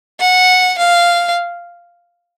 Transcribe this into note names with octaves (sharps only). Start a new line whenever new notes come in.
F#5
F5